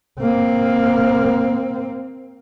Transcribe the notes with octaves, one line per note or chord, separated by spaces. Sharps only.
A#3 C4